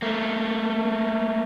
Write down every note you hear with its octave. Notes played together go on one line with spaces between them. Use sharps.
A3 A#3